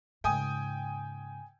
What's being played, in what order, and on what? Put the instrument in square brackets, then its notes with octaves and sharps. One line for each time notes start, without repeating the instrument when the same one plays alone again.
[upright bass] G#2 C#3 [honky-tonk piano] G5 G#5 D#6